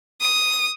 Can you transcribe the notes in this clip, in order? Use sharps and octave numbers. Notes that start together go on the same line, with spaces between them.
D#6